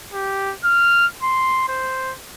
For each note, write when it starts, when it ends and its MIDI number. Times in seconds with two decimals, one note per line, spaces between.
0.13 0.53 67
0.64 1.06 89
1.23 1.63 84
1.68 2.14 72